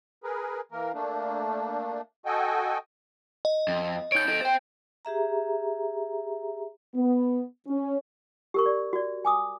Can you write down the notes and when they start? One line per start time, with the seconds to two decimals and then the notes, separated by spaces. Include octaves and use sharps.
0.24 G#4 A#4 B4
0.72 E3 A#3 A#4
0.94 A3 A#3 D4
2.26 F#4 A4 D#5 G5 G#5
3.45 D#5
3.68 F2
4.12 D#4 C#5 G6 D7
4.28 A4 D#5
4.42 C5 G5
5.05 G4 G#4 E5 A#5
6.94 B3
7.68 C#4
8.54 G4 A#4 C#6
8.66 D5
8.93 F#4 D5
9.25 G#5 D6 D#6